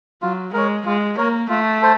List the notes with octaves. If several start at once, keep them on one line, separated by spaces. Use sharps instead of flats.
F#3 F4
G#3 A#4 C#5
G#3 F4
A#3 A#4 C#5
A3 F4
A4 C5